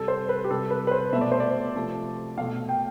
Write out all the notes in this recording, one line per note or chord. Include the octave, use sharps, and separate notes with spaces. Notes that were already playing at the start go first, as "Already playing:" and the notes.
Already playing: C3 G3 A4
C5
B4
G4
C3 G3 A4
B4
B4
C5
B2 A3 E5
D5
C5
D5
C3 F3 A3
B2 A3 F5
G5